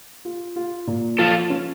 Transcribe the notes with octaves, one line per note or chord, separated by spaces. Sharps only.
F4
F4
A#2
F3 F4 A4
C#4